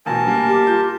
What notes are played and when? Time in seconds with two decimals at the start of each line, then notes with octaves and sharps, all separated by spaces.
0.06 A1 B2 A#4 G#5 A5
0.27 G3 A#3
0.49 G4
0.67 F4 G6